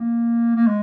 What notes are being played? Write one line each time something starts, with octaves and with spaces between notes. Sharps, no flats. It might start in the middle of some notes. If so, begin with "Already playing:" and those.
Already playing: A#3
A#3
G#3